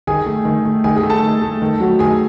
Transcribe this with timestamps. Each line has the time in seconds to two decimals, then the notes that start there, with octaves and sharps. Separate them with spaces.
0.07 D#3 G#4 G#5
0.26 A3
0.45 D#3
0.65 A3
0.84 D#3 G#4 G#5
0.96 G#4 G#5
1.03 A3
1.10 A4 A5
1.22 D#3
1.42 A3
1.62 D#3
1.80 F#3 A3
1.99 D#3 G#4 G#5